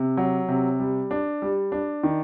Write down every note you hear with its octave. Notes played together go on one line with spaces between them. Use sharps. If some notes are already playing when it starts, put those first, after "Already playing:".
Already playing: C3
F#3
C3
G3
D4
G3
D4
D#3